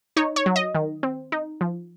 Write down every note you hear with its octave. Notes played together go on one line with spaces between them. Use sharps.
D#4 C#5
C#5
F#3
D#5
D#3
C4
D#4
F3